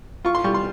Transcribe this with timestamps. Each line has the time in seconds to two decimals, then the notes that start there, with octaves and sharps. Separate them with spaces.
0.25 F4 C#6
0.35 C6
0.44 G3 C#6
0.54 C6